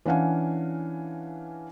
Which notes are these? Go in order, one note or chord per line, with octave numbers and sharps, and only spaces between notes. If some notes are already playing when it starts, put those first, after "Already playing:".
E3 C#4 D4 F5 F#5 G#5